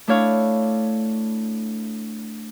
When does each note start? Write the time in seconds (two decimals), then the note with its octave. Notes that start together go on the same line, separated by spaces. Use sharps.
0.08 A3 D4 E4 C#5 F5